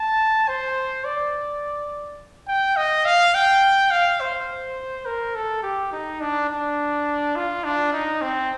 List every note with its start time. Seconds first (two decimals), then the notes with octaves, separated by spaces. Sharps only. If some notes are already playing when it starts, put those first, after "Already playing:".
Already playing: A5
0.48 C5
1.04 D5
2.48 G5
2.76 D#5
3.05 F5
3.34 G5
3.91 F5
4.20 C5
5.05 A#4
5.35 A4
5.63 G4
5.92 D#4
6.20 D4
6.49 D4
7.36 F4
7.64 D4
7.93 D#4
8.22 C4